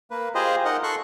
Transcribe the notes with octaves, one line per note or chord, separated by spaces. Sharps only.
A#3 B4
F4 G4 G#4 C5 D#5
D#4 A#4 D#5 F#5
A4 C6 C#6 F#6